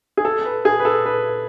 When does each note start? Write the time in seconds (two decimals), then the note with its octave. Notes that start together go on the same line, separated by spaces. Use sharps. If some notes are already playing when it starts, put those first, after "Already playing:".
0.17 G#4
0.25 A4
0.45 B4
0.65 G#4
0.80 B4
0.85 A4
1.06 B4